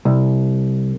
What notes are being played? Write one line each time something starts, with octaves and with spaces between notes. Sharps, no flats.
C2